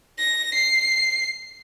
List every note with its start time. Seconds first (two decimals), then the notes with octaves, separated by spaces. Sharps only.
0.18 A#6
0.54 C7